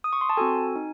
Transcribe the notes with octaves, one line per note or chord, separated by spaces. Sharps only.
D#6
C#6
C6
A5
C4 F#4 A4 G#5
D#4